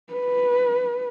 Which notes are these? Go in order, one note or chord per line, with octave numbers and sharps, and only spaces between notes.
B4